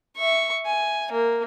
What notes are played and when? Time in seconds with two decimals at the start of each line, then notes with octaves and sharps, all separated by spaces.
0.16 E5 C#6
0.66 G#5
1.12 A#3